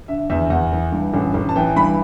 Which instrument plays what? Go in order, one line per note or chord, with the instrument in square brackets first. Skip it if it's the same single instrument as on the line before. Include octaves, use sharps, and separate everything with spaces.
[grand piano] D3 E5
E2 E5
E2 F#5
E3
G2
A1
A1
A5
E3 G5
G2 B5